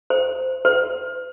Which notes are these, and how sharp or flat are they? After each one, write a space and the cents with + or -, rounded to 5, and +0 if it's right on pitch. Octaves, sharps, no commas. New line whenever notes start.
C5 -15
C5 -40